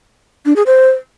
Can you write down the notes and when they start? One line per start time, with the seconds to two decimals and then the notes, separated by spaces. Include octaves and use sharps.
0.46 D4
0.56 G#4
0.66 C5